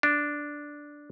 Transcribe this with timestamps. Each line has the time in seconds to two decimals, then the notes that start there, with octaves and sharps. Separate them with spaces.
0.03 D4